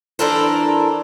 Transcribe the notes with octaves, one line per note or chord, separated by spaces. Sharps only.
E3 D4 A4 A#4 C5